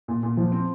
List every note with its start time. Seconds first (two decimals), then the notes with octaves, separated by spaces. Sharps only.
0.08 A#2
0.23 A#2
0.37 F3
0.52 C4